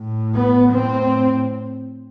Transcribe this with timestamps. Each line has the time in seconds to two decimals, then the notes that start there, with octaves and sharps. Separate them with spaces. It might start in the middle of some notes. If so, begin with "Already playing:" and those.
Already playing: A2
0.34 B3
0.73 A2 C4